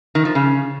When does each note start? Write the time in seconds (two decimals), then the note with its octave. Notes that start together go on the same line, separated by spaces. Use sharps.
0.15 D#3
0.25 F3
0.35 C#3